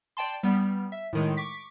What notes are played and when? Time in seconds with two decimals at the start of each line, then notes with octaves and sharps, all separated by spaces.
0.17 D5 G5 A5 C6
0.43 G3 B3 F6
0.92 E5
1.13 A2 D#3 G#3
1.37 C#6 D6 B6